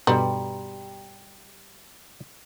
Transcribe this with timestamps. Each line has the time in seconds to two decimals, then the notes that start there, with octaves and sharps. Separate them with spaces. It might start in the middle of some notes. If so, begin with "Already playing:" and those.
0.07 G2 B2 G3 A4 G5 A#5 C6